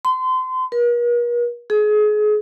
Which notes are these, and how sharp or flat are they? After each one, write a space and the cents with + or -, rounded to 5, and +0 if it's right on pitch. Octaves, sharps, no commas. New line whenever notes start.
C6 -30
A#4 +45
G#4 +30